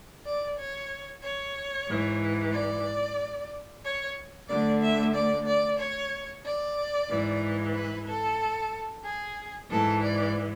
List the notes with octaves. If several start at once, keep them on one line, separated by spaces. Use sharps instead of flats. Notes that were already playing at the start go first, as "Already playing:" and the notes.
D5
C#5
C#5
G#2 E3
D5
C#5
D2 D3 D5
E5
D5
D5
C#5
D5
G#2 E3
B4
A4
G#4
G#2 E3 A4
D5